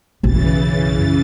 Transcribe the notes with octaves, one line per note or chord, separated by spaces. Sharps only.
B1 F#2 C#3 E3 A6